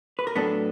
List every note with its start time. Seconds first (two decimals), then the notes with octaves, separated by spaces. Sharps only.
0.19 B4
0.27 A#4
0.35 A2 F#3 B3 D4 A4